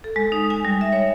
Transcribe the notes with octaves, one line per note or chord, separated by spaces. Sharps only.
A4
G#3
D#4
G#5
G3
E5
C#5